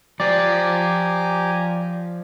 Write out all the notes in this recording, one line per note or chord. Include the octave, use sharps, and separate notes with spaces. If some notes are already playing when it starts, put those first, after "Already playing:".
F3 G4 C5 D5 G#5 A#5